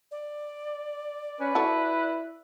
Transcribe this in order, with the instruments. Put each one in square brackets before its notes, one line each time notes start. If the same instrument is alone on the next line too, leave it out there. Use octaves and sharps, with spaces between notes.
[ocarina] D5
[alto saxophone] C#4 [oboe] B4
[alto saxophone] E4 [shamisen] F#4 A4